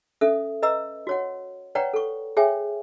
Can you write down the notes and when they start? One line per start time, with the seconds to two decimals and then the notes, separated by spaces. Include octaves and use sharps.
0.21 C#4 A4 E5 D#6
0.62 B4 D#5 A#5 E6
1.07 F#4 C#5 F#5
1.75 B4 C#5 D5 F#5 G5 A#5
1.94 A4 C#6
2.37 G#4 C#5 E5 G5 G#5